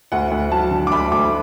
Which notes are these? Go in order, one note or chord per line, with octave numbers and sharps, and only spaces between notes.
D2 F#5
D2
F#3 A5
D3
D6
D2 B5
D2 D6